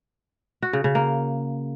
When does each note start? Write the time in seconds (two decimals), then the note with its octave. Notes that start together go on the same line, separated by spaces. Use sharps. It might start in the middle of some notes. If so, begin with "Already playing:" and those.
0.62 F#4
0.73 C#3
0.84 C#3
0.95 A#3